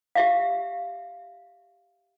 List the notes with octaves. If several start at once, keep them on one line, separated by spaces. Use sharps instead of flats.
G4 E5 F5